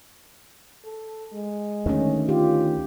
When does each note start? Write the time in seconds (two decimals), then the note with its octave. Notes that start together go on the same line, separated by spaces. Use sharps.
0.85 A4
1.33 G#3
1.86 D2 D#3 A3 C#4
2.29 F4 G4